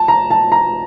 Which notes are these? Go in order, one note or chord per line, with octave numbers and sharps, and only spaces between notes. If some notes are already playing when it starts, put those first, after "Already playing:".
Already playing: A5
A#5
A5
A#5